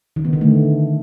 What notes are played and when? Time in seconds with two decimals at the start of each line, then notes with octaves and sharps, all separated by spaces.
0.16 D#3
0.25 B3
0.33 D3
0.41 A3